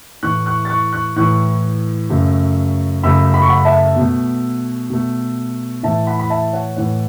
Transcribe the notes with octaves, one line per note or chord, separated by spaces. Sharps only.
A2 E3 A3 C#6 F#6
C#6 F#6
A6
C#6 F#6
C#6 F#6
A2 E3 A3 C#6 F#6
F#2 C#3 A3
F#2 C#3 A3 B5 E6
B5
C#6
F#5 B5
E5 A5
B2 A3
B2 A3
A2 E3 A3 E5 A5
F#5 B5
B5
E5 A5
C#5 F#5
A2 E3 A3 C#5 F#5